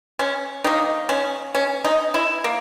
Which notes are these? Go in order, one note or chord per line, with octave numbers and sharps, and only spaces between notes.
C#4
D#3 A#3 D#4
C#4
C#4
D#4
E4
A#3